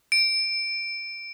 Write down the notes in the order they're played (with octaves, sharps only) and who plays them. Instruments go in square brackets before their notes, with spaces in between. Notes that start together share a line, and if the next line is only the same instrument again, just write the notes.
[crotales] D7